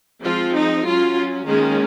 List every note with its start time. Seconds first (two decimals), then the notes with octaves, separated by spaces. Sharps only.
0.23 F3 G#3 C4 F4
0.55 D#4
0.86 F#3 C#4 F4
1.47 D#3 G#3 A#3 C#4 G#4